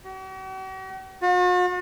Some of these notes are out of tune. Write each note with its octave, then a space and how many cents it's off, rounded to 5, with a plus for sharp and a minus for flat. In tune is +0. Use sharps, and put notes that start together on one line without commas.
F#4 +45
F#4 -45